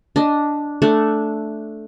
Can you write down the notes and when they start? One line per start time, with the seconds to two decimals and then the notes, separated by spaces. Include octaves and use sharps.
0.16 D4 D#5
0.82 A3 D4 F#5